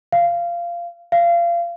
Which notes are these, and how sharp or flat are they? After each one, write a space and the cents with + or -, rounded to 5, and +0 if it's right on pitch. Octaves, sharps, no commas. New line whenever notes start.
F5 -20
F5 -30